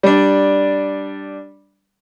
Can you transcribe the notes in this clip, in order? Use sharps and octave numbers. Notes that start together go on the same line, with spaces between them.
G3 D4